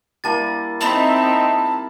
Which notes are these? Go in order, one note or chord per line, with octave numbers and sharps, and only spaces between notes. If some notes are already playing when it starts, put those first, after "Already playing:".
G3 A#3 E4 A5 A6
C4 D#4 E5 A5 B5 F#7